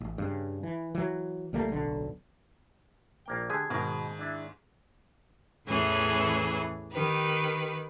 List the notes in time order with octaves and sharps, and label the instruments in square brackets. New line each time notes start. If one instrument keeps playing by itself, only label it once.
[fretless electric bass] A1
G2 C#3
E3
E3 F#3
C#2 G3 A3 A#3
D1 B1 D3
[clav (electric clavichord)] A#1 A#3 G5
[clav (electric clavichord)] D3 G4 [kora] G#4
[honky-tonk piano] G#2 D#3 [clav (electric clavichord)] B2 A#4
[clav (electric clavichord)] D4 E4 E5
[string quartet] E2 A2 E3 C#4 G#4
D#3 G4 B4